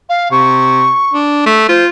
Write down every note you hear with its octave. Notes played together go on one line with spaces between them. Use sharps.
F5
C3 C#6
D4
A3
F4 C5